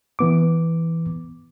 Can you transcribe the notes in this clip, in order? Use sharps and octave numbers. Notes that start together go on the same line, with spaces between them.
E3 B3 D6